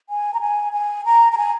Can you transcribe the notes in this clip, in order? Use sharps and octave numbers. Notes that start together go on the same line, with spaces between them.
G#5
A#5
G#5
G#5
A#5
A#5
G#5